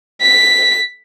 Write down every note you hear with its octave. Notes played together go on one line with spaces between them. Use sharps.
B6